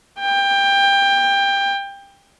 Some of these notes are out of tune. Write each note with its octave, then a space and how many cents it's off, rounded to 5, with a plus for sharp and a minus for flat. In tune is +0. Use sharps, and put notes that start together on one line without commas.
G5 +20